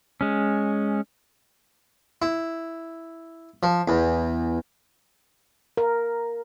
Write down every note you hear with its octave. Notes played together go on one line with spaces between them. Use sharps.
G#3 C#4
E4
F3
E2
A#4